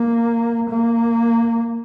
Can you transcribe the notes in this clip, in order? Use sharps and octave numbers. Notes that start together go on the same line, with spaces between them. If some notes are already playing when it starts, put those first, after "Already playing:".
Already playing: A#3
A#3